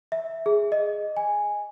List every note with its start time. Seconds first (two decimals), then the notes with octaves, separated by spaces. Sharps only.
0.12 E5
0.46 G#4
0.72 D#5
1.17 G#5